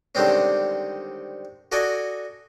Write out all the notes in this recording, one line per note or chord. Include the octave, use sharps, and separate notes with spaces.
D3 D#3 G3 G#3 C4 C#4
F#4 A4 D5 D#5 G#5